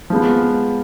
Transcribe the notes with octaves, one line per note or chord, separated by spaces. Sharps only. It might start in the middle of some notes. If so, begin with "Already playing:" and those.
F3 G#3 B3